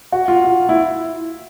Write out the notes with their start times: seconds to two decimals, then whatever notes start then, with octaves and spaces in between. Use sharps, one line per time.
0.12 F#4
0.28 F4
0.44 F4
0.69 E4